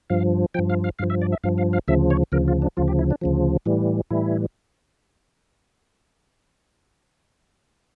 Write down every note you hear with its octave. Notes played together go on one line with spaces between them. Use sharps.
G2 F3 F5
G2 F3 G5
F5
F5
G2 F3 F5
E5
D5
E5
G2 F3 F5
F5
F5
D2 C#3 F3 E5
C#5
D2 C#3 F3 A#4
F4
D4
D2 C#3 F3 F4
G4
E4
D4
D2 C#3 F3
A2 E3 G3
A2 E3 G3 E4